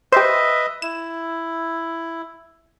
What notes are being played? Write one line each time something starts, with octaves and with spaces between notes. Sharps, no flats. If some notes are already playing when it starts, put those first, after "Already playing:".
G4 B4 C5 D#5 E5
E4 E7